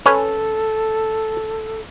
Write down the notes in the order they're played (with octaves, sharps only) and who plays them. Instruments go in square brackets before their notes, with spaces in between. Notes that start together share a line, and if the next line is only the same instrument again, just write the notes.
[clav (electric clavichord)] C#4 B4 C#5 [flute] A4